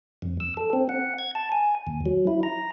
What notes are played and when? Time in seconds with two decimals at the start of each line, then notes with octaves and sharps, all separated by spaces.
0.22 F2
0.40 E6
0.57 A4
0.73 C4
0.89 F#5
1.18 G#6
1.35 A5
1.52 G#5
1.87 D#2
2.06 F#3
2.27 E4
2.43 A#5